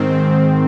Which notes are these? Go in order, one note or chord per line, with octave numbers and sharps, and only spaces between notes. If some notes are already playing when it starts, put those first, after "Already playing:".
Already playing: G#2 D#3 C4